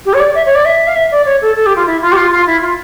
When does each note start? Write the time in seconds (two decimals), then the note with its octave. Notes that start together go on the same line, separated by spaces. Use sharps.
0.05 G4
0.14 C#5
0.20 D5
0.35 E5
0.46 C#5
0.55 D5
0.65 E5
0.87 F5
0.95 E5
1.11 D5
1.26 C#5
1.42 A4
1.56 A4
1.66 G4
1.76 F4
1.86 E4
2.02 F4
2.12 G4
2.17 F4
2.31 F4
2.47 E4
2.62 F4